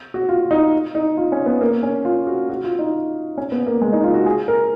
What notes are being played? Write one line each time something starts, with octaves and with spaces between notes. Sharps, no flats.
F#4
F4
D#4
D#4
F4
C#4
B3
A#3
C#4
F4
F#4
F#4
F4
D#4
C#4
B3
A#3
G#3
D#4
F4
F#4
G#4
A#4